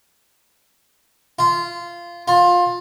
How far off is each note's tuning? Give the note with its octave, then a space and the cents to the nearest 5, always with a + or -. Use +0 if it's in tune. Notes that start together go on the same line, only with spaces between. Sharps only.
F4 -15
F4 +20